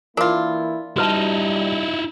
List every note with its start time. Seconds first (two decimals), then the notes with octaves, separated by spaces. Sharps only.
0.17 E3 A#3 D4 E4 F4 A#4
0.96 G3 D#4 E4 F#4 B4 A5